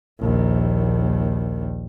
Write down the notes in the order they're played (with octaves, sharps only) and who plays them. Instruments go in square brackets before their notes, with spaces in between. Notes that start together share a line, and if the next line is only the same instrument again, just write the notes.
[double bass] A#1 D#2